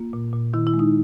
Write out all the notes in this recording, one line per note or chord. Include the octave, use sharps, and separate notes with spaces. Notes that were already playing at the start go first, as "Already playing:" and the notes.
Already playing: A#3 F4
A#2
A#2
D#3 E4
E4
G#3
D#4